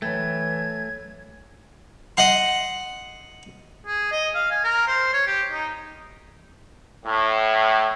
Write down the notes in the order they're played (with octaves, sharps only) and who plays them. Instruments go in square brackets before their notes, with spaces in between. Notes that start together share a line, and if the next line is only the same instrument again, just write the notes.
[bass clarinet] E3 [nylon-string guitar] F#3 G5 [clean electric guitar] A3 [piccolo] G#6
[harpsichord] D#5 F#5 C6
[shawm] G#4
D#5
F5
G#5
A#4
C5
C#5
G4
D#4
[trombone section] A2